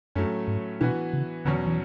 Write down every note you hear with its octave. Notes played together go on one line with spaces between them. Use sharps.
F#2 A2 F#3 A3 C#4
G#2
B2 E3 B3 F#4
C#3
E2 B2 D3 F#3 C#4
E3